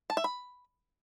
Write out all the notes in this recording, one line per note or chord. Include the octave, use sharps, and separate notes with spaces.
A5
E5
B5